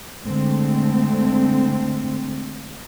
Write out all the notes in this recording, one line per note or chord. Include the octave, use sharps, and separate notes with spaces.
D3 G#3 A3 C4